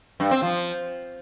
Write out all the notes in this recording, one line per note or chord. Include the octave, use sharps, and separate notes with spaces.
G2
C4
F3